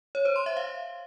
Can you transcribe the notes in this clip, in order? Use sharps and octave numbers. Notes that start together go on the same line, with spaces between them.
C#5
C5
C6
E5
F5